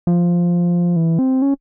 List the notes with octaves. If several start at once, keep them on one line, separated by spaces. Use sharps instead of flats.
F3
E3
C4
C#4